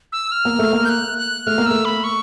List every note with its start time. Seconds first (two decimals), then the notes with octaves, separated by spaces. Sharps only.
0.12 E6
0.32 F6
0.45 A#3
0.59 A3
0.73 A#3
0.85 G6
0.89 F#6
1.18 F#6
1.47 A3 F6
1.58 A#3
1.66 A3 E6
1.85 B5
2.04 C#6